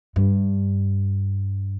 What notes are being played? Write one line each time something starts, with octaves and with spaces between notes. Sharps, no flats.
G2